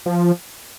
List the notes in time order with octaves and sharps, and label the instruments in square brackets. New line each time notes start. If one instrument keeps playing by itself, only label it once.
[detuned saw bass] F3